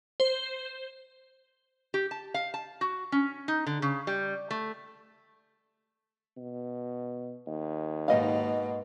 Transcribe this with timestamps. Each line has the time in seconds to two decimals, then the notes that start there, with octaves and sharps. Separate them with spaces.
0.20 C5
1.94 G4
2.11 A5
2.34 F5
2.54 A5
2.81 F#4
3.12 C#4
3.48 D#4
3.66 D3
3.82 C#3
4.07 G3
4.51 A3
6.37 B2
7.47 D#2
8.08 G#2 B2 A#3 D#4 D#5 F5